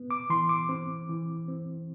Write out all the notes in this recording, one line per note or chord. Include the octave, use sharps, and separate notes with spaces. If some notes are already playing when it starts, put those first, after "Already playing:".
Already playing: B3
D6
E3 C6
D6
C4
E3
C4